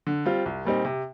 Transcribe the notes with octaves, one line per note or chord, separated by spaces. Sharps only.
D3
G3 C4 F4
C2
A#2 G3 C4 D#4
C3